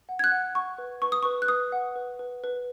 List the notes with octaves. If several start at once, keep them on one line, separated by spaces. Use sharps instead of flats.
F#5
G#6
F#6
F#5
F#5 C#6
B4
B4 C#6
D#6
B4 C#6
F#6
B4 D#6
F#5
B4
B4
B4